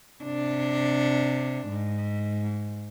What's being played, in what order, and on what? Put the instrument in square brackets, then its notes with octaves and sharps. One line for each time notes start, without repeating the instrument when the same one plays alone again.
[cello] C3 D4
G#2